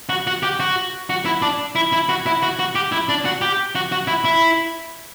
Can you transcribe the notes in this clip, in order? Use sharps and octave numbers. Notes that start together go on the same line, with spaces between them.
F#4
F#4
G4
F#4
F#4
E4
D4
E4
E4
F#4
E4
F#4
F#4
G4
E4
D4
F#4
G4
F#4
F#4
E4
E4